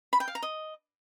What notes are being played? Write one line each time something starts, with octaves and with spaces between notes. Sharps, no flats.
B5
G5
F5
A#5
D#5